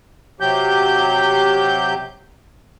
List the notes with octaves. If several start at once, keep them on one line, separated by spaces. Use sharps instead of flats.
C3 F#3 G4 G6